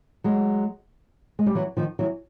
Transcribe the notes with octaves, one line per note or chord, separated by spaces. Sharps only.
F#3 G#3
G#3
G3
E3 F#3
D#3 F3
E3 F#3